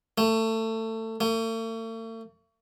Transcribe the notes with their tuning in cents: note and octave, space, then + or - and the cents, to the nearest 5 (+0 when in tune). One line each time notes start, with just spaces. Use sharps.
A3 +25
A3 +45